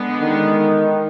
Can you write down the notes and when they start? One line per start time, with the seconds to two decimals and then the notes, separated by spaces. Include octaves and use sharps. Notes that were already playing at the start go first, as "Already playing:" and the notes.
Already playing: D3 G#3 B3
0.22 D#3